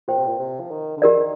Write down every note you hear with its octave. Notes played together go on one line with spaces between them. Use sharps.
A#2 G4 C5 G5
C3
A#2
C3
F3
D#3
D3
D#3 G4 A#4 D5